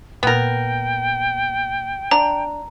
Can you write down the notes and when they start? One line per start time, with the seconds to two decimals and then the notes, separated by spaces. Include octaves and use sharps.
0.23 A#2 B3 A#4 G5
2.11 D4 A#5